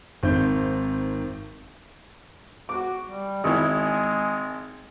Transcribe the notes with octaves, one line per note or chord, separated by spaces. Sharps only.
G#1 D#3 C4 G6
F#4 D6
G3
G#1 G#3 E4